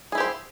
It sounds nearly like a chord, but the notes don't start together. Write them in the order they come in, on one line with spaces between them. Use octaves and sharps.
G#4 E4 G4 C5